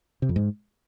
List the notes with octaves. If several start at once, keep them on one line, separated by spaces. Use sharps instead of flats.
C3
F2
G#2